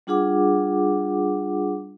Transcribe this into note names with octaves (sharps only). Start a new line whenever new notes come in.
G3 D4 F4 G#4 F#5 D6